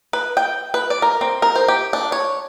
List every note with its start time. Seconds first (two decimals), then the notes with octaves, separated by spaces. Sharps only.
0.13 B4
0.37 G5
0.74 B4
0.90 D5
1.02 A#4
1.21 C4
1.42 A#4
1.56 C5
1.68 G4
1.93 D4
2.12 C#5